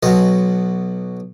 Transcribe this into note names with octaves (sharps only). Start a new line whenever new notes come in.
B1 B2 F#3 D#5